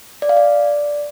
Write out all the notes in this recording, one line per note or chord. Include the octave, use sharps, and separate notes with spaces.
D5
F5
D5